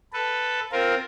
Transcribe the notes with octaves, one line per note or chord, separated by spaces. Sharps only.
A4 B4
C4 F4 A#4